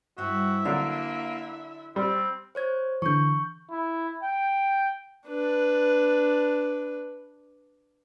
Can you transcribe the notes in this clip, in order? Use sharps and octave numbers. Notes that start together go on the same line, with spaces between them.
G2 C4 E4 F#4 E5
D3 F#3 A#3 D4 A#4
G3 C4
C5 C#5 G#6
D3 E3 C#6 G6
E4
G5
D4 B4